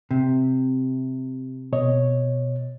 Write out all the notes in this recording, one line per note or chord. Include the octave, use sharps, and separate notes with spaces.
C3
B2 C#5 D#5